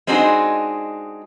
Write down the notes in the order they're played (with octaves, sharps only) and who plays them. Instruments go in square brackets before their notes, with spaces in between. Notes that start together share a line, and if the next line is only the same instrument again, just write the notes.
[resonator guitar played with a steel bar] G#3 C4 D4 D#4 F#4 G#4